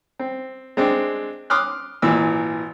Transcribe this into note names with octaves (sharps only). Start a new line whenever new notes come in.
C4
G#3 C4 D4
C6 D6 D#6 F6 F#6
G#1 A#2 E3 E6